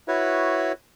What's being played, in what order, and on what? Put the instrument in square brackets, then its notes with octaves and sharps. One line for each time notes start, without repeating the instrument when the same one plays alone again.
[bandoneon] E4 F#4 B4 C#5